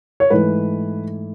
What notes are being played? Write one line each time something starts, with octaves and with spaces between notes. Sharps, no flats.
C#5
G#2 E3 A3 B4